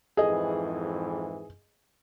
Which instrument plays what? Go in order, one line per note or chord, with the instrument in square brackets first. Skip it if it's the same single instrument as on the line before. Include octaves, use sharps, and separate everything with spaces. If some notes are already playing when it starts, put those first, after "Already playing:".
[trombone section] F2 G#2 E3 [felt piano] G#4 D#5